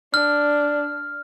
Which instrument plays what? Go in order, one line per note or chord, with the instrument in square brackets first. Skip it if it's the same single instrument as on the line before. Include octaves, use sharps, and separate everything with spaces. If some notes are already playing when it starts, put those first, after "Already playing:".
[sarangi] D4 [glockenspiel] F6